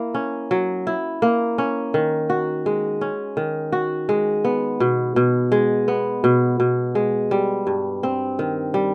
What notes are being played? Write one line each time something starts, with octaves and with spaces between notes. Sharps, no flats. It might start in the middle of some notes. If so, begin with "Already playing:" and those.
Already playing: A#3 E4
C#4
F#3
E4
A#3
C#4
D#3
F#4
G#3
C#4
D#3
F#4
G#3
B3
B2
B2
G#3
B3
B2
B2
G#3
G3
G2
C4
D#3
G3